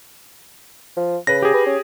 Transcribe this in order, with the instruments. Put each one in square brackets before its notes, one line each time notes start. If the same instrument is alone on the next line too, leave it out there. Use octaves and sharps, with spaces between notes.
[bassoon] F3
[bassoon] C#3 [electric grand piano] B4 A#6
[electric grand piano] G4 G#4
[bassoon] B4
C#4